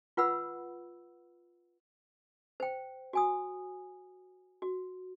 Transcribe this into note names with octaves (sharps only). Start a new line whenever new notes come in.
F4 B4 F#5 B5 E6
C5 G5
F#4 G#5 D#6
F#4